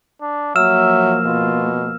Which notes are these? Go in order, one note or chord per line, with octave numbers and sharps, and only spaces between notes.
D4
F3 F#3 A#3 E5 E6 F6 E7
B2 F4